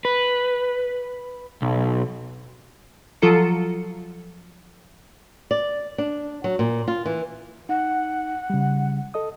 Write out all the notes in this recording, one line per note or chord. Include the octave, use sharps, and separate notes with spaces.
B4
B1
F3 F#3 F4 A4 A#5 C#7
D5
D4
F#3
A#2
F4
E3
D#4 F#5
C#3 G3
A4 D#5 D#6